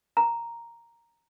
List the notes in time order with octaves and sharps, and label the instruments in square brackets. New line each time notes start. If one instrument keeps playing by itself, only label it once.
[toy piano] A#5